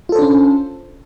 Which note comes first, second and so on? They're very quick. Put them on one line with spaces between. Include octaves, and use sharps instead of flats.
F4 A4 C5 D4 C#4